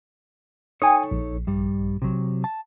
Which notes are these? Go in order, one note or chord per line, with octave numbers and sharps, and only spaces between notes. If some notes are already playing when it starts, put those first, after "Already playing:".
D#4 A4 C#5 G5 G#5 D#6
A#1
G2 G3
C3 F#3
A5